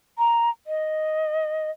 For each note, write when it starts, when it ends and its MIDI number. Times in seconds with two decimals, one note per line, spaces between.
0.18 0.50 82
0.67 1.70 75